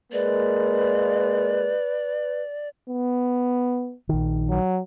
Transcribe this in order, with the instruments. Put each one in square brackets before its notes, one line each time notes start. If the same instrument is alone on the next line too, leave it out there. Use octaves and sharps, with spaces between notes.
[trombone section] G#3 A#3 [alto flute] B4 [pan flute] D5
[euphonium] B3
[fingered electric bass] A#1 D#3
[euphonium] F#3